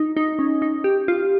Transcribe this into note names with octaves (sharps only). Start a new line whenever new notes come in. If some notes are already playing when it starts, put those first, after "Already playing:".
Already playing: D#4
D#4
C#4
D#4
G4
F4